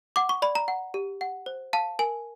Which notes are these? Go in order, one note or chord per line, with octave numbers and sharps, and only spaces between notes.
F#5 D6
C#6
D5 B5
A#5
F#5
G4
F#5
C5
F5 A5
A#4 G#5